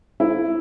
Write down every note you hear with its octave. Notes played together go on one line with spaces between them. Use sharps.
E4